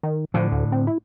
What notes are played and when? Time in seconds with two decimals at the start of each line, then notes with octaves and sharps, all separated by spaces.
0.03 D#3
0.34 A2 D3 F3
0.52 D2
0.72 C4
0.87 E4